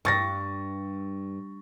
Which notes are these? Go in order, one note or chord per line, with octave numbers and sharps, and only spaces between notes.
G2 C#6 A6 A#6